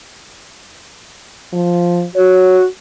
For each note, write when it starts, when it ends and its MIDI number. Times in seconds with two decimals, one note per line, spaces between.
1.53 2.05 53
2.16 2.66 66
2.16 2.60 73